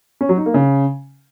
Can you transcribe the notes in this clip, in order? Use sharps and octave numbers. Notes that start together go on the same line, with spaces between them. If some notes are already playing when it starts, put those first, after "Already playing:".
C#4
F#3
D#4
A#3
C#3